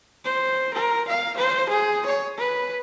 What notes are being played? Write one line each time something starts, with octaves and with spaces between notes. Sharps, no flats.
C5
A#4
F5
C5
G#4
C#5
B4